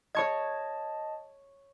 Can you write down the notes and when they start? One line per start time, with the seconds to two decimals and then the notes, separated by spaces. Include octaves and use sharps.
0.15 C#5 D#5 A5 C#6 G#6